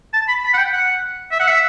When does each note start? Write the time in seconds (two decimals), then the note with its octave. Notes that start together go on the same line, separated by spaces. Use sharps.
0.14 A5
0.28 B5
0.44 B5
0.54 F#5
0.58 G5
0.73 F#5
1.32 E5
1.40 F#5
1.48 E5